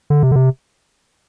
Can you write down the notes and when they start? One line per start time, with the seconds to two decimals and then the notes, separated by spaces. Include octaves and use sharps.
0.10 D3
0.23 C3
0.31 D3
0.36 C3